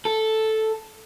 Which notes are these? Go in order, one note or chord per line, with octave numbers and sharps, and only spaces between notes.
A4